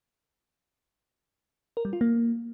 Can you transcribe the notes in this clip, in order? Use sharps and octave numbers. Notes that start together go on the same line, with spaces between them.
A#4
G3
F4
A#3